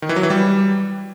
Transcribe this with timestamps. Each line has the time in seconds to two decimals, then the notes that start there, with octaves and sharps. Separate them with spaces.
0.02 D#3
0.09 E3
0.16 F#3
0.23 E3
0.30 G3